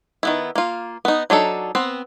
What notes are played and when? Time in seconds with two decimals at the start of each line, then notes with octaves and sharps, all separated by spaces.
0.23 D#3 B3 E4
0.55 A#3 F4
1.05 B3 D#4
1.30 F#3 D4 D#4 A4
1.75 B3 C4